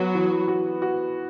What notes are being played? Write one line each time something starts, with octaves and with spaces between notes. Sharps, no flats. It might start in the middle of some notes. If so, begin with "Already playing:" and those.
Already playing: F#3 B3 F#4
E3
F#4
F#4